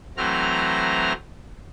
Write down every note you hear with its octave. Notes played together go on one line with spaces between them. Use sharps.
E3 F#3 A3 C4 A#5 F6